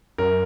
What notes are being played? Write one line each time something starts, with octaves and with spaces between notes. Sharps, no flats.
F#2 A#4